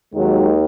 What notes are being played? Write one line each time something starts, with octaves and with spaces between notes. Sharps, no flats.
D#2 D#3 F#3 G#3